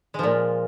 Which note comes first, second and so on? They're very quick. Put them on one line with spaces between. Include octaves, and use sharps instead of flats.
G#3 F3 A#2